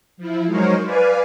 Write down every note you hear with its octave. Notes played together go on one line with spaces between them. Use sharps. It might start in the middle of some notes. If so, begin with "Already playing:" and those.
F3 E4
F#3 G#3 D#4 A#4 C5 C#5
B4 D5 F5 G#5